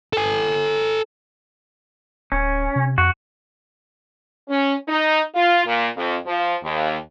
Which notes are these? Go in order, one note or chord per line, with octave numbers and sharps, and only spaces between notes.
A4 G#5
D1 C#4
C3
F2 F#4
C#4
D#4
F4
A#2
F2
F3
D#2